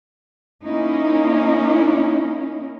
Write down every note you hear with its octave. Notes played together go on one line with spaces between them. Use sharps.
A#3 C#4 D#4 E4